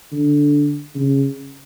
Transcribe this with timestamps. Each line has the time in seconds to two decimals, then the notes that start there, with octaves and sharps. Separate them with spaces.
0.13 D3
0.95 C#3